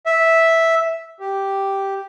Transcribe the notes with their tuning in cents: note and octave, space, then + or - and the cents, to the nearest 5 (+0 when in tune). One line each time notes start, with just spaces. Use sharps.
E5 -5
G4 -5